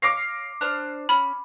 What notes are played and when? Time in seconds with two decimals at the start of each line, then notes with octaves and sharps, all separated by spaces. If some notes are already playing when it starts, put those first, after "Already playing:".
0.02 C#5 F5 C#6 D6 A#6 C7
0.61 D4 C5 F6
1.09 C#4 B5